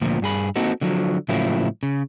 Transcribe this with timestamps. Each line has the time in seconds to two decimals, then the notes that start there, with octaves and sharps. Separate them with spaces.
0.01 D2 A#2 F3
0.22 G2 G#4 B5
0.56 A#3 C4 D#4 F#4 A4
0.81 D3 F3 F#3
1.28 A2 C#3 F3 F#3 A#3 E4
1.83 C#3